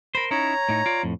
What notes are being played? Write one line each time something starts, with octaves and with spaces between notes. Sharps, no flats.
A#4 C5 B5
C#4 D#4 E4 C#5 A#5
A2 D#4
F4 D5
F2 A2